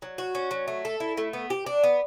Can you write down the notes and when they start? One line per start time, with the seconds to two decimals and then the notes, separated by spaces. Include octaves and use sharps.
0.02 F#3
0.18 F#4
0.35 C#4
0.51 F#3
0.68 A3
0.85 A4
1.00 E4
1.17 A3
1.33 B3
1.50 G4
1.66 D4
1.84 B3